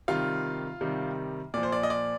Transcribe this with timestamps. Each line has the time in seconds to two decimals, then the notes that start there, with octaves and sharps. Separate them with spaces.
0.08 C3 D#3 G3 F4 F5
0.81 C3 D#3 G3
1.54 A#2 F3 D5
1.63 C5
1.72 D5
1.83 D#5
1.90 D5